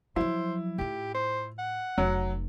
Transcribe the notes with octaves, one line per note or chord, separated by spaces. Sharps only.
F3 F#3 E4 C5
A2 F4 G4
C5
F#5
F1 F#3